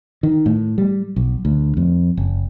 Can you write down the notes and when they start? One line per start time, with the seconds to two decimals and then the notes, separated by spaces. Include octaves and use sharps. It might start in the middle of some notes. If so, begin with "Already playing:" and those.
0.23 D#3
0.46 A2
0.78 G3
1.16 B1
1.45 D2
1.77 F2
2.17 F#1